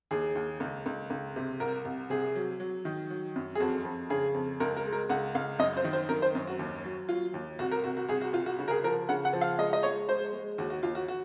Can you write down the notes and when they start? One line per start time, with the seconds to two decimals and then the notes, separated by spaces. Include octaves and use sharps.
0.11 D#2 G#4
0.35 D#2
0.60 C#2
0.86 C#2
1.10 C#2
1.36 C3
1.60 C2 A#4
1.85 C2
2.10 C3 G#4
2.36 F#3
2.60 F#3
2.85 D#3
3.10 F#3
3.36 F#2
3.55 G#4
3.60 F2 F#4
3.85 F2
4.10 C#3 G#4
4.34 F2
4.60 C#2 A#4
4.76 A#4
4.85 G#3
4.92 A#4
5.10 C#2 F#5
5.35 C#2 F5
5.59 F#2 D#5
5.77 C5
5.84 D#3
5.93 C5
6.09 F#2 A#4
6.22 C5
6.35 F#2
6.47 F#4
6.59 D#2
6.84 F#3
7.09 F#3 F4
7.34 D#2
7.59 C2 F#4
7.71 A#4
7.84 C2 F#4
7.97 F#4
8.09 C2 G#4
8.21 F#4
8.33 C2 F4
8.46 F#4
8.59 C#3 F#4
8.68 A#4
8.71 G#4
8.84 F3 A#4
9.09 C#3 F#5
9.25 F#5
9.33 F3
9.41 F5
9.59 G#3 D#5
9.73 D#5
9.83 G#3 C#5
10.09 G#3 C5
10.33 G#3
10.58 D#2 F#4
10.70 F#4
10.83 D#2 F4
10.95 F#4
11.08 F#4